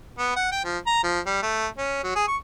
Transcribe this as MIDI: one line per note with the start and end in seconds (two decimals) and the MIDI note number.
0.19 0.34 59
0.36 0.49 78
0.52 0.59 79
0.64 0.78 53
0.87 1.00 82
1.04 1.20 53
1.26 1.41 55
1.43 1.67 57
1.77 2.03 61
2.04 2.11 54
2.15 2.23 68
2.28 2.36 85